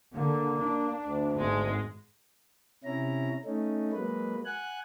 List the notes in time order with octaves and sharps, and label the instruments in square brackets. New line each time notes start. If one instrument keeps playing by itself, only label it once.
[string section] D3 [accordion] A#3
[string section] D4
[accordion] D2
[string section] G#1 G#3
[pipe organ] C3 C#4 E4 A#5
A3 C#4 D#4
F#3 G#3 A#3 B4
F#5 G#5 F#6